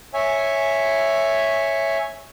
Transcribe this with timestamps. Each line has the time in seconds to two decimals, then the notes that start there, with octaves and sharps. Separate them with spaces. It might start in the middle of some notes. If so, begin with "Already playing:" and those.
0.14 C#5 E5 G#5